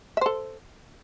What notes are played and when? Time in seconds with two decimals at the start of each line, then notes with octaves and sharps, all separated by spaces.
0.17 E5
0.21 C5
0.26 A4